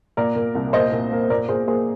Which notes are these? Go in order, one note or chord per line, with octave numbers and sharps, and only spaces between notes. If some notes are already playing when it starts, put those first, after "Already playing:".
A#2 A#4 D5
A#2
C2
A#2 C5 D#5
A#2
A#3
A#2 A#4 D5
A#2 G#4 C5
A#3 G#4 C5